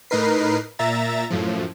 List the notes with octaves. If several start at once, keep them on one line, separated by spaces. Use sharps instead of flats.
A2 D#4 A#4 B4 C7
A#2 E5 A#5 A6
F#2 A2 F3